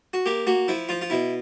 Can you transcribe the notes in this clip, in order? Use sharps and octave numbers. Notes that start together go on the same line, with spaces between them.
F#4
A#3 G4
A#3 F#4
F3 E4
F3 F4
F4
B2 E4